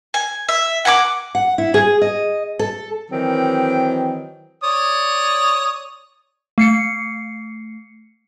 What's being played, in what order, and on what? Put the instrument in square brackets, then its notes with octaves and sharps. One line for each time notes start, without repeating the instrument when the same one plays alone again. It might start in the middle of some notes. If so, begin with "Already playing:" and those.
[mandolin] G#5
E5
F#5 G#5 A#5 D6
[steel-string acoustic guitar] F#5
E4
G#4
D#5
A4
[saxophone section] D#3 E3 F#3 C4
[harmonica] C#5 D5 D#6
[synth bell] A3 C7 C#7